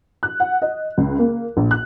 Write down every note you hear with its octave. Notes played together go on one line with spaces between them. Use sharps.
F#6
F#5
D#5
C#2
A#3
A#1
F#6